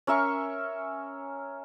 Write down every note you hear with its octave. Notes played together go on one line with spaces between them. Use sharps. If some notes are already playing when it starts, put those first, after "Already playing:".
C#4 A#4 E5 C#6